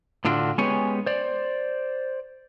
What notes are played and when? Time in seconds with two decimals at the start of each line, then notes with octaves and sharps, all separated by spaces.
0.25 A2 D3 D4 F4 F#4
0.58 G#3 B3 C#4 G4 C#5 G#5
1.06 C5 D5